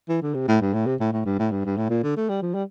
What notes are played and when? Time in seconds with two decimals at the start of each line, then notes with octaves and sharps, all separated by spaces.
0.09 E3
0.22 D3
0.34 C3
0.48 A2
0.61 G2
0.73 A2
0.86 C3
1.00 A2
1.12 A2
1.26 G2
1.39 A2
1.51 G2
1.65 G2
1.77 A2
1.90 A#2
2.03 D3
2.16 A3
2.29 G3
2.42 F3
2.54 G3